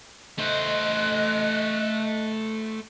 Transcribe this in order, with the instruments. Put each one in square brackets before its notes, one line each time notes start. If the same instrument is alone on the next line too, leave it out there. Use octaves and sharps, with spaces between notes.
[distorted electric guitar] A3 C5 [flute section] D#5 F#6